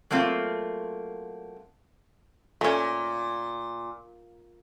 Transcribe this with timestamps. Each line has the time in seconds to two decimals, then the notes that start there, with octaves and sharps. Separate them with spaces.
0.11 F#3 A3 A#3 C4 F4
2.61 A#2 A3 C#4